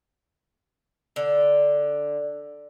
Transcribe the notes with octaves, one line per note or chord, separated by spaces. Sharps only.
D3